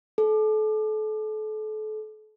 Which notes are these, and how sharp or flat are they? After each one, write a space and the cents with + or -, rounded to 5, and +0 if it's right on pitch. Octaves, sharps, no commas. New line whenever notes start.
A4 -35